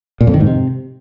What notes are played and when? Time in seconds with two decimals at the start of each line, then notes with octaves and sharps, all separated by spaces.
0.21 A#2
0.27 F2
0.34 D#3
0.40 G#2
0.47 C3